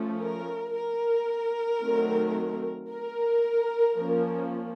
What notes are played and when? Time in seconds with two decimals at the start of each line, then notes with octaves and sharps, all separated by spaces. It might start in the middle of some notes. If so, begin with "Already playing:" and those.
Already playing: F3 A3 C#4
0.23 A#4
0.76 A#4
1.83 D#3 F#3 A3 C4
2.91 A#4
3.97 F3 A#3 C#4